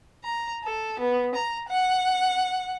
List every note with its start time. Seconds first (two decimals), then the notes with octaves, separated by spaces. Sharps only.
0.24 A#5
0.64 A4
1.00 B3
1.35 A#5
1.69 F#5